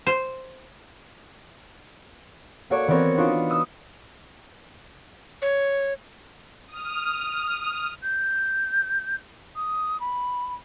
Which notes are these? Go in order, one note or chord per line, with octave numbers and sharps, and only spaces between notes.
C5
A#3 F#4 A4 C#5 D5
E3 B3 C4 E4 A#4 C#5
D4 D#4 F4 F#4 B4
D#6 E6
C#5
D#6 F6
G6
D#6
B5